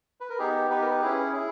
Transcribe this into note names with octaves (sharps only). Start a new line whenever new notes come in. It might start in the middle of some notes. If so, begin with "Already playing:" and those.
B4
A#4
B3 D#4 G4 G#4
B3 D#4 G4 B4
A#4
B4
C#4 E4 G#4
E4 G#4